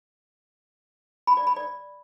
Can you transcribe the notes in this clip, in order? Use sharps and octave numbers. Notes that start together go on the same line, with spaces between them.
B5
D5
B5
D5